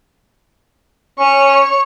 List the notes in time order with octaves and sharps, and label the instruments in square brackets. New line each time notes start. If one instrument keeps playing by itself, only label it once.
[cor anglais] C#4 [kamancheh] C#5 C#6